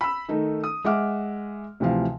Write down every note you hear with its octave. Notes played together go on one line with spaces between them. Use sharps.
B5 E6
D#3 A3 D#4
D#6
G#3 E5 F#5 D6 F6
D2 C3 E3 F3 F5